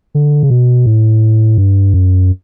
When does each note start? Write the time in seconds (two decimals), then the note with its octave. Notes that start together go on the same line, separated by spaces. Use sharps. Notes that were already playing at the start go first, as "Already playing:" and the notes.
0.15 D3
0.43 C#3
0.50 B2
0.86 A2
1.58 G2
1.94 F#2